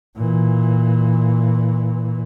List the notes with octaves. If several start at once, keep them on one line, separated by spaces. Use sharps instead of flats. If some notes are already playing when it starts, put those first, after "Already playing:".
A#2 E3